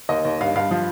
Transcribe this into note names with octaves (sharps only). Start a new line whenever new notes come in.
D#2 D#5
D#2
G2 F5
G2 F5
F3